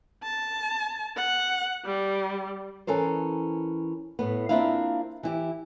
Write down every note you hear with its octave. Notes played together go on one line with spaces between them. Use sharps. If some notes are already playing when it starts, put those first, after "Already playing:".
A5
F#5
G3
E3 C#4 A4 A#4 C5
A2 B3
A#3 C4 D4 E4 F4 F5
E3 E4 G4